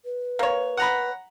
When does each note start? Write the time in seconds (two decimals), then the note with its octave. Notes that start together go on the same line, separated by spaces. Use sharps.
0.05 B4
0.39 A#3 C#5
0.77 F#5 A#5 B5